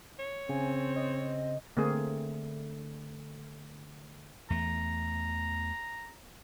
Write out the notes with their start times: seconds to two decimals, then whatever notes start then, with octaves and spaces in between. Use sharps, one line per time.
0.19 C#5
0.49 C#3 C4 G#5
0.96 D#5
1.77 D3 A3 A#3 C4 G#4
4.50 E2 A3 A#5